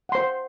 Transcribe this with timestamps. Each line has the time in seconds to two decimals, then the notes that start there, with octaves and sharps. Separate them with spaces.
0.09 F#5
0.12 C6
0.15 C5